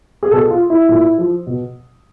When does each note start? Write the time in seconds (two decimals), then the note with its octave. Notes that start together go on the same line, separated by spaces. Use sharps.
0.23 G#4
0.31 B2 A4
0.51 F4
0.70 E4
0.89 A#2
1.18 F3
1.47 B2